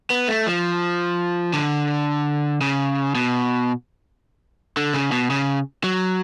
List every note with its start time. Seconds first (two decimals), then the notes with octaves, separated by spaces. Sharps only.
0.10 B3
0.28 A3
0.47 F3
1.53 D3
2.61 C#3
3.15 B2
4.77 D3
4.94 C#3
5.12 B2
5.30 C#3
5.84 F#3